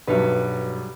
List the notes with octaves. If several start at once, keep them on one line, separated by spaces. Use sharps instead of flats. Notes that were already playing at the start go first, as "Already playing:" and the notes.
B1 G2 F#3 G3 B4 E5